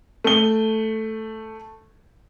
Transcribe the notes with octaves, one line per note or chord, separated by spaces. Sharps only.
A3 G7